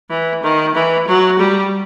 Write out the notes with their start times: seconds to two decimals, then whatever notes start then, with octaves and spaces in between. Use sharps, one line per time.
0.10 E3
0.43 D#3
0.75 E3
1.07 F#3
1.39 G3